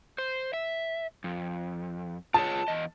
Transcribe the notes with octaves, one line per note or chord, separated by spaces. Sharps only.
C5
E5
F2
F4 G#4 C#5 A5
E2 D#5